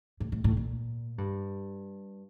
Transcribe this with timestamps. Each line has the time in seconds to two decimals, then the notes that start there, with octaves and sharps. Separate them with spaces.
0.20 A2
0.32 A2
0.44 A2
0.57 A#2
1.18 G2